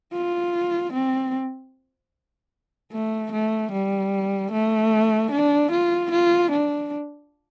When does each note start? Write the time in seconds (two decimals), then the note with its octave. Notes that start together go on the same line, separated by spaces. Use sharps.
0.13 F4
0.93 C4
2.92 A3
3.32 A3
3.72 G3
4.52 A3
5.32 D4
5.72 F4
6.12 F4
6.52 D4